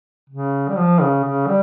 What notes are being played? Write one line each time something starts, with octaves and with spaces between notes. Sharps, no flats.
C#3
G3
F3
C#3
C#3
G3